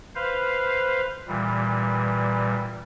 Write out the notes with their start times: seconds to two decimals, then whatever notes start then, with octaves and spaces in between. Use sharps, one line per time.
0.15 B4 C5 F5
1.28 A#2 E3 G3